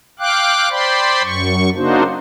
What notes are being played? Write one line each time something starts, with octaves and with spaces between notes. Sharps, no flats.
F5 G5 D6 F#6
C5 D5 G5 B5 C6
F#2 C#6
C#3 A#3 D4 D#4 F#4 C5